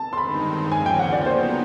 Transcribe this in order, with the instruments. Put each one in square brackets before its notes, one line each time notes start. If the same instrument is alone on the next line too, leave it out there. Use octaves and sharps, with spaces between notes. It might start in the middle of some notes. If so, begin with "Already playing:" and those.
Already playing: [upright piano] A5
C6
[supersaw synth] G2 D#3 G#3 C4 D#4 [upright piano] B5
[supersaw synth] D#2 C#3 F3 A#3 C#4 [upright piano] G#5
[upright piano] G5
F#5
D5
[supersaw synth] F#3 B3 D#4 [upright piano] C5